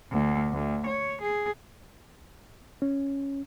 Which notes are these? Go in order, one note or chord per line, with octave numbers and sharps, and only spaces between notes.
D2
D2
C#5
G#4
C#4